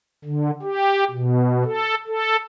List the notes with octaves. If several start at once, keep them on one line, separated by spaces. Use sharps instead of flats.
D3
G4
B2
A4
A4